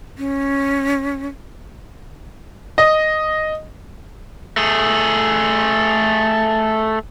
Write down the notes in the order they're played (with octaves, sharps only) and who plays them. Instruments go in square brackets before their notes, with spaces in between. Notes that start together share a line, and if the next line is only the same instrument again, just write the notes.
[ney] C#4
[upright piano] D#5
[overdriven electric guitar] A3 G#4